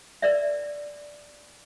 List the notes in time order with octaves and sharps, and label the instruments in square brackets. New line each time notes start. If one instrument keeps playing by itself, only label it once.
[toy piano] A#4 D5 E5